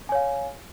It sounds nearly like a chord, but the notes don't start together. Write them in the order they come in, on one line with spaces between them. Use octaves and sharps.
G#5 C#5 F5